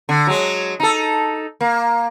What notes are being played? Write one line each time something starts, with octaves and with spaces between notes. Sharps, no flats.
D3
F#3 G#3
D#4 A4
A#3